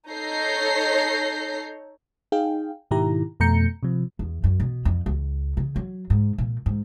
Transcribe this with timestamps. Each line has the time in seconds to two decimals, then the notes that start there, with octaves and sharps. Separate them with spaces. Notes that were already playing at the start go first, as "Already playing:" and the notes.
0.10 D#4 A4 C#5 G6 A#6 C7
2.32 D#4 G#4 F5 G5
2.91 G#2 B2 D#3 E4 G4 A#5
3.40 F2 B2 A3 A#5 G6 C#7
3.83 C3 F3
4.19 E2
4.44 F#2
4.60 B2
4.85 F2
5.06 C#2
5.57 C#3
5.76 F#3
6.10 G#2
6.38 A#2
6.66 G#2